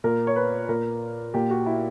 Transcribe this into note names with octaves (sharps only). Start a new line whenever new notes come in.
A#2 A#4
C#5
B4
A#2 A#4
A#2 G4
F#4
E4